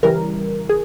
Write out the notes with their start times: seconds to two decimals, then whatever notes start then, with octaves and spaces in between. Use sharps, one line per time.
0.03 C#3 E3 G3 A#4
0.69 G#4